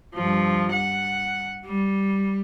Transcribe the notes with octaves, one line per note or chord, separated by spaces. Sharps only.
G2 F3
F#5
G3